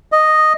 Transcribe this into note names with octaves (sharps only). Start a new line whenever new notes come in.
D#5